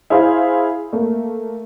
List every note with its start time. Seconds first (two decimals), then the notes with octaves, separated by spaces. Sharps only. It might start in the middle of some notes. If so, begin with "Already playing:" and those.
0.10 E4 G#4 C5 F5
0.93 A3 A#3